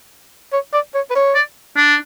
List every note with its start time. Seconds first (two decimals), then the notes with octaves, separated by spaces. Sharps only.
0.53 C#5
0.73 D5
0.94 C#5
1.10 B4
1.15 C#5
1.35 D5
1.76 D4